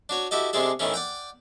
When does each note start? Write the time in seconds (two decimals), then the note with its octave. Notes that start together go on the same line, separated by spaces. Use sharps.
0.09 D4 F#4 C#5
0.31 E4 F#4 G4 A4 D#5
0.53 C3 G#3 D4 G#4 A4
0.79 A2 D#3 E3 A3 C#4
0.94 D5 F#5 G5